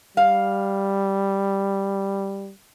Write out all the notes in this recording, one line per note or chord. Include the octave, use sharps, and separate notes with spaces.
G3 F5